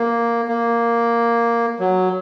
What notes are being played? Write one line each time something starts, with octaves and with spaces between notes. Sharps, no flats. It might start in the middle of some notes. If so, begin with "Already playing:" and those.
Already playing: A#3
A#3
F#3